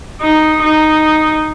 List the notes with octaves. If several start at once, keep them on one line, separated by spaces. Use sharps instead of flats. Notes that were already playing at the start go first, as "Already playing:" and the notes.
D#4
D#4